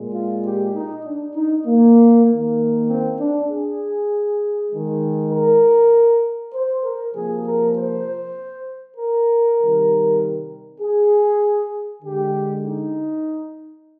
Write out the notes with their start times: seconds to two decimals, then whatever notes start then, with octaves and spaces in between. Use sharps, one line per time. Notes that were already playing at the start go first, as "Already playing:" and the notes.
Already playing: A#2 G#3
0.13 F4
0.43 G4
0.75 D#4
1.05 D4
1.35 D#4
1.66 A#3
2.27 D#3 A#3
2.88 C4
3.19 D4
3.49 G#4
4.70 D#3 G#3
5.31 A#4
6.54 C5
6.84 A#4
7.15 C3 F3 A#3 G#4
7.46 A#4
7.76 C5
8.97 A#4
9.59 C3 D#3 G3
10.81 G#4
12.02 D3 G#3 G4
12.64 D#4